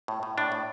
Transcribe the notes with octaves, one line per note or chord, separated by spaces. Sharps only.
A2
A2
A2 D4
A2